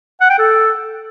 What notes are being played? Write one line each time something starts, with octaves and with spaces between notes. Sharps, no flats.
F#5
G5
A4